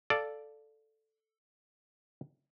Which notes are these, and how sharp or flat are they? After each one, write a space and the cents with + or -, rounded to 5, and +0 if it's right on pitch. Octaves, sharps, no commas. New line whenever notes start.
A4 +0 D5 -5 F5 -5